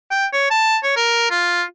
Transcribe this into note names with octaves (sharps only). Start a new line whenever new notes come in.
G5
C#5
A5
C#5
A#4
F4